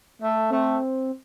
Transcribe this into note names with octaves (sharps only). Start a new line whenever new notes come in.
A3
A3 C4